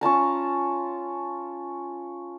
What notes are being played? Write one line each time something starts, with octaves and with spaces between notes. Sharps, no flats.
C#4 F4 A5 A#5